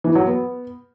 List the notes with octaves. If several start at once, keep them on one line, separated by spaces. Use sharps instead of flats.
E3
F#3
B3